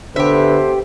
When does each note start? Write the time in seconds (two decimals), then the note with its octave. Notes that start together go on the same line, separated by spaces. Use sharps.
0.16 D3 B3 G4 A4 B4 C5 E5